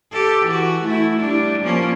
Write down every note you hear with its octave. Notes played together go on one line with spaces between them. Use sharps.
G4 A4
E3 F#4
A3 E4
G3 D4
F3 A#3 C#4